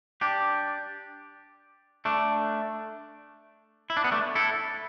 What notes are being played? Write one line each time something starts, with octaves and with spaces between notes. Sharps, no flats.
D4 G4
A3 D4
E4
D4
B3
A3 D4
E4 A4